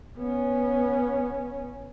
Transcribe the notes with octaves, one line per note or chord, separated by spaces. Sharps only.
B3 C#4